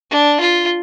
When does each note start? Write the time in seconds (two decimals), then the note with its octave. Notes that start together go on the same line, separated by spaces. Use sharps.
0.10 D4
0.40 F4